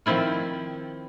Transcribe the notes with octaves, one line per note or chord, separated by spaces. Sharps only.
D#3 F3 C4 E4 F4